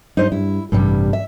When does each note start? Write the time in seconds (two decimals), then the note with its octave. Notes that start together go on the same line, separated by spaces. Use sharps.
0.17 G2 D#4 C5 D#5
0.32 G2 E4
0.72 A1 G2 C3 G3
1.13 E5